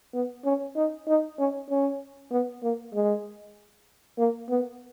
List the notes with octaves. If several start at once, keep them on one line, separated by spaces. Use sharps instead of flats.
B3
C#4
D#4
D#4
C#4
C#4
B3
A#3
G#3
A#3
B3